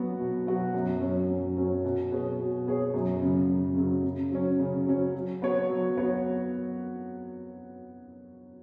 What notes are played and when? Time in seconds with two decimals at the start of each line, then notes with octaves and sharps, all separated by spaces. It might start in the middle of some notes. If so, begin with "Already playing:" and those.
Already playing: F#3 B3 F#4
0.19 B2
0.46 F#3 B3 F#4
0.74 F#2
1.02 F#3 C#4
1.29 F#2
1.57 F#3 C#4
1.84 B2
2.12 B3 G#4 C#5
2.39 B2
2.67 B3 G#4 C#5
2.94 F#2
3.22 C#3 F#3
3.49 F#2
3.76 C#3 F#3
4.04 C#3
4.31 F#3 C#4
4.59 C#3
4.86 F#3 C#4
5.15 F#3
5.42 B3 F#4 C#5
5.69 F#3
5.97 B3 F#4 C#5